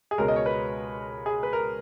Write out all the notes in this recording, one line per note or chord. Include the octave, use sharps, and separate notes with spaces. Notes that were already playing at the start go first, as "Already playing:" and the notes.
G#4
C#2 B2 G#3 C#4 A#4
D#5
C#5
B4
G#4
B4
A#4